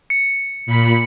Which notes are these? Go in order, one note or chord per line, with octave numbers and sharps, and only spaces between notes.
C#7
A#2 B5